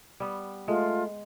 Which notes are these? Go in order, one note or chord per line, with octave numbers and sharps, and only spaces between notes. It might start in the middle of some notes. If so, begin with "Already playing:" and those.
G3 B3
G#3 A3 F4